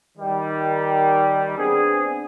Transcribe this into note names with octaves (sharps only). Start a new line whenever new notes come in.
D#3 G3
B3 C4 D4 G#4